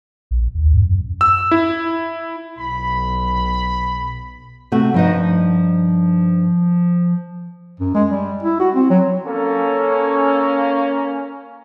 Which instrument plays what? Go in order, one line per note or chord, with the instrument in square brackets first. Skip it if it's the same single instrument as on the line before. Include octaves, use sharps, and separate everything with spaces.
[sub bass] A#1
D#2
G2
F#2
[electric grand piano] E6
E4
[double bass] B1 [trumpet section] B5
[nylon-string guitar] C3 A3 F#4
[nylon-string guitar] G2 D#4 D#5 [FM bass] F3
[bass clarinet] F#2
G#3
G3
E4
F#4
C4
F#3
[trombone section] A#3 C#4 [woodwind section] A4